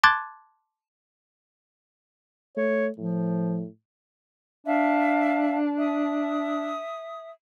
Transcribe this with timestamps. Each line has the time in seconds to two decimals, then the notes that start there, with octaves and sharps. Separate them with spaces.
0.03 A5 C6 D6 F#6 G#6 A6
2.57 A3 C#5
2.98 A2 F3
4.67 D4 E5 F5 A5
5.78 E5 D#6